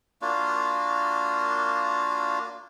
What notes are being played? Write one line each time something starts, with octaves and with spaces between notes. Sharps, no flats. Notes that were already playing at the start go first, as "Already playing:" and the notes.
A#3 D4 F4 F#4